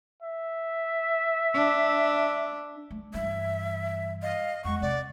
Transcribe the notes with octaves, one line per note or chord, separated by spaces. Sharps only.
E5
D4
A3
G2 E3 E5
D#5 F5
E2 G#3 F#5 C#6
C3 C4 D5